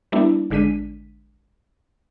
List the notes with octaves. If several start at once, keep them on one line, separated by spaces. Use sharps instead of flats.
G3 A#3 B3 D4 E4
A1 D3 G#3 D4 B6 D#7